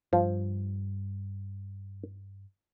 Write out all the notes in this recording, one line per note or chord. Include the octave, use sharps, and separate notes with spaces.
G2 F3